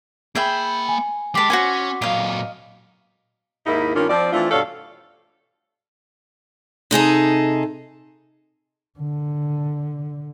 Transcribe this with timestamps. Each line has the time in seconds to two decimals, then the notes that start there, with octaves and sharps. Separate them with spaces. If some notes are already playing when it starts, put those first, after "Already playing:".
0.35 A#3 G#4 E5 G5 B5
0.88 G#5
1.35 G#3 G4 A5 D6 B6
1.50 C#4 F#4 C5 G#5
2.02 A#2 F#3 D#5 F5
3.66 D#2 G#2 A#3 D#4 E4
3.96 G2 D#3 A#3 C#4 D4 F4
4.10 F3 C4 D5
4.33 E3 A3 C4 D4 F4
4.51 G2 B2 D4 A4 C#5 F5
6.91 C3 D#4 G#4 A4
8.99 D3